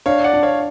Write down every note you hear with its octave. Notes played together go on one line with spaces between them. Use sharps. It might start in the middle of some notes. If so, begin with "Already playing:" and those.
D4 C#5 F5
D5 F#5
D4
C#5 F5